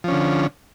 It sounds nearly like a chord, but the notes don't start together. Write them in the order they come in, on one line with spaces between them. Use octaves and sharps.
F3 C#4 D3